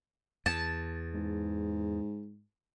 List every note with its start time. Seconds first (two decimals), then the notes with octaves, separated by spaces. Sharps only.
0.46 E2 A5
1.14 G#2